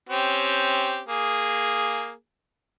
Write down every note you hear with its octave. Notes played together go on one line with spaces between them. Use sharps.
C4 C#4 G4
A#3 G#4